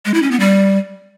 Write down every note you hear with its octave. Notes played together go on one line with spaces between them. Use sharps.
G#3
E4
C#4
B3
G3